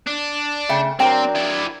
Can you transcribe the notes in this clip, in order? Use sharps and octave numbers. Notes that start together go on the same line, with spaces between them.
D4
C#3 A3 E5 G5
F#3 C4 D4 A#4 C5 G5
E4 D5